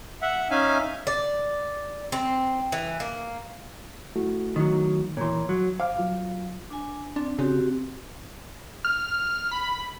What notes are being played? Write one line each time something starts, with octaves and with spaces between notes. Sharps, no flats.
E5 F#5
C#4 D#4 E5 F5 G#5
D5
C4
E3
A#3
A3 E4 F#4
D#3 F#3
A#2 E3 C#5 C6
F#3
C5 F5 D6 F6
F#3 F4
D4 G#5
C4 D4
C#3 C4 F#4 G4
F6
B5